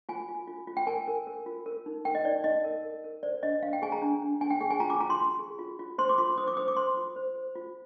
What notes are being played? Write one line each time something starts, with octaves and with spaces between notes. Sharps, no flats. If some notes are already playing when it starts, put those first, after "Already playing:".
F4 G#5
F4
F4
F4
G5
A#4 G#5
A#4
A#4
F4
A#4
D#4
A#4 G5
D#5
D#4 D5
D#4 D#5
A#4
A#4
A#4
C5 D5
D4 D#5
D4 F5
G5
G#4 G#5
A#5
D4
D4
D4 G#5
G5
G#4 G5
G#5
F4 A#5
D6
F4 A#5
C6
F4
G#4
F4
F4
C5 C6
D6
F4 C6
C5 D#6
D6
C5 D#6
D6
C5 C6
F4
C5
C5
F4